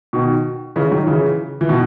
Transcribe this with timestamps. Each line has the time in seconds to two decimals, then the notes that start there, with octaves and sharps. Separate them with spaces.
0.13 B2 D#3
0.76 C#3 E3
0.91 D#3 F#3
1.07 C#3 E3
1.61 E3
1.69 B2 D#3